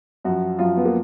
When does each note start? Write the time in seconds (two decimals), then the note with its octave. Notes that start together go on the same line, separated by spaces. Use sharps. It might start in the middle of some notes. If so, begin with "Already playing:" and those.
0.25 F#2 F3 F#4
0.59 F#2 F3 F4
0.77 B3
0.85 A#3